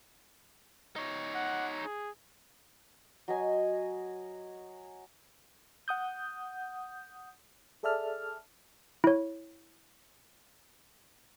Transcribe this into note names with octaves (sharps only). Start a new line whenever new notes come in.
D#4 C#5
F#5
G#4
F#3 D#5 G#5
F#5 D#6 G6
G#4 A4 D5 E5 A5 F6
E4 C#5